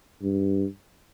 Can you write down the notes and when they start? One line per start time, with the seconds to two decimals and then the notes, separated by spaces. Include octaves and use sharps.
0.22 G2